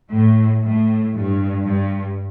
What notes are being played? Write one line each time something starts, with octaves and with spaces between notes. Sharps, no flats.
A2
A2
G2
G2